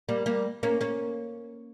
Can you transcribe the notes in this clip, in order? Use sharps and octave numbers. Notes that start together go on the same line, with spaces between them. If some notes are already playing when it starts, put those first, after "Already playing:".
G3 A#3
G3 A#3
A#3 C#4
A#3 C#4